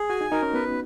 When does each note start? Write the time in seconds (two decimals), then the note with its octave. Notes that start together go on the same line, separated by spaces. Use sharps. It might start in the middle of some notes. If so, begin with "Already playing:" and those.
Already playing: G#4
0.09 F#4 G#5
0.21 D#4
0.32 D#4 A#4
0.43 C#4
0.54 B3 B4